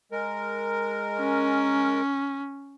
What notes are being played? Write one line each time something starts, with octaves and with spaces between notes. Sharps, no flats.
G#3 A#4
C#4